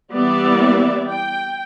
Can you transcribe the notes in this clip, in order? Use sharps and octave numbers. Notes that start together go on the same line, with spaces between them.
E3 G3 B3 D5 E5
G5